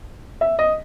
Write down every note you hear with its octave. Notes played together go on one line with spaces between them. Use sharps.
E5
D#5